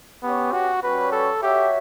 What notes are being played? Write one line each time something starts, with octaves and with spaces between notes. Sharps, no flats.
B3 C#4 G4 C#5
F#4
G3 C#4 F#4 B4 C#5
A4
F#4 G4 C#5 E5